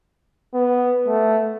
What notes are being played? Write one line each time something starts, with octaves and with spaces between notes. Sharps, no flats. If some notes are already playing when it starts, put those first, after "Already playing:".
B3
A3